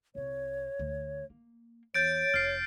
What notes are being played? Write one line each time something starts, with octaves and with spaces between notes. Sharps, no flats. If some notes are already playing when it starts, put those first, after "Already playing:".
C2 C3 C#5
D2
A#3
E2 C#5 G6 A6 D7
F1 F6 C7